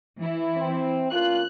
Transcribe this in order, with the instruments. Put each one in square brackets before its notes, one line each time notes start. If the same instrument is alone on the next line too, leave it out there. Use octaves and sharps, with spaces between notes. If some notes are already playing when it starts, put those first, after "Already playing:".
[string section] E3 E4
[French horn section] C4
[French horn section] A#3 C#4 F4 [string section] F#6